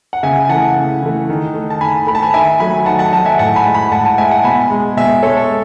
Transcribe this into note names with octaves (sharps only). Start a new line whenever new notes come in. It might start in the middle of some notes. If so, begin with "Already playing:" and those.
F#5
C#3 E5 G#5
G#5
E3 A3 F#5 A5
C#3
E3 A3
D#3
A3
A5
D#3 G#5 B5
A3 B5
A5
G#5 B5
D#3 E5 G#5
F#3 A3 G#5 B5
D#3 F#5 A5
F#5 A5
F#3 A3 F#5 A5
E5 G#5
A2 F#5 A5
G#5 B5
G#3
G#5 B5
A2 F#5 A5
F#5 A5
G#3 E5 G#5
F#5 A5
B2 G#5 B5
G#3
B2 E5 G#5
G#3 A4 C#5
A4